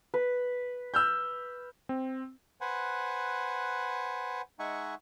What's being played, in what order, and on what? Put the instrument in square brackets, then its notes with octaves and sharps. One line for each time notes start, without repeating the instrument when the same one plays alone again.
[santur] B4
[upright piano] E6 F6 G6
[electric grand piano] C4
[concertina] B4 C5 F#5 G#5
G#3 D#4 E5 F#5 G#5 C#6